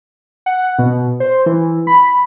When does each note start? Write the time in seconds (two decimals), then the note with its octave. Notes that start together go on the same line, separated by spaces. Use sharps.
0.46 F#5
0.79 B2
1.20 C5
1.46 E3
1.87 B5